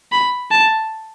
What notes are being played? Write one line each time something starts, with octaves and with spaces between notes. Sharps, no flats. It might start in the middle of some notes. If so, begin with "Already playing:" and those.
B5
A5